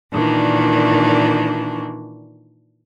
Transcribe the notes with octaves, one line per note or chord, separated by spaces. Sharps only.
A#2 D#3 E3 D4